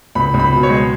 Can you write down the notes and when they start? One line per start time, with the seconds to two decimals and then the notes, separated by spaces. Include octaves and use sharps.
0.15 C#2 B5
0.34 C#2
0.39 B5
0.52 B2
0.63 C#5
0.70 G#3